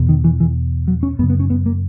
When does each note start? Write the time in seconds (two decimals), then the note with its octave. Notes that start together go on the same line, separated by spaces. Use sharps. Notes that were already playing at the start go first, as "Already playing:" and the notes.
Already playing: E2 B2
0.09 D#3
0.24 E3
0.40 E3
0.88 F#3
1.03 C#4
1.19 F#2 B3
1.23 C#3
1.30 B3
1.40 C#4
1.50 B3
1.66 A#3